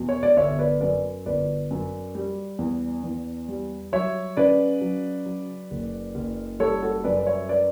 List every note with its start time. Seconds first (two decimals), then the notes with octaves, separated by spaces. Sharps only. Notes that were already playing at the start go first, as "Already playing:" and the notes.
Already playing: E2 B2
0.09 C#5
0.23 D5
0.37 G1 C#5 E5
0.59 B4 D5
0.80 F#2 B4 D5
1.26 G1 B4 D5
1.71 F#2
2.15 G3
2.59 E2
3.03 E2
3.48 G3
3.92 F#3 C#5 E5
4.37 C#3 B4 D5
4.81 F#3
5.26 F#3
5.71 F#1
6.15 F#1
6.60 G3 A4 C#5
6.82 F#4 A4
7.04 F#2 B4 D5
7.19 D5
7.27 C#5 E5
7.49 B4 D5